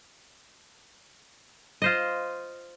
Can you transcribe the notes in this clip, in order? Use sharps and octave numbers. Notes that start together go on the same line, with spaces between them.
F4 C5 D#5